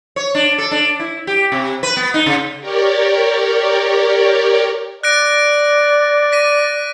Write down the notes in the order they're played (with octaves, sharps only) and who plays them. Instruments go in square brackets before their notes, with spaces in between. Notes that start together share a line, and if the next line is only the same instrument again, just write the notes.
[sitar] C#5
D4
A4
D4
E4
G4
C3
B4
B3
D#4
C#3
[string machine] G4 A#4 C#5 D5
[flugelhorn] D5 [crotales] F#6 A#6 D7
[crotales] A#6 B6 D#7